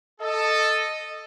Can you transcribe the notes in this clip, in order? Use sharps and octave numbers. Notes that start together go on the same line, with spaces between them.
A4 D#5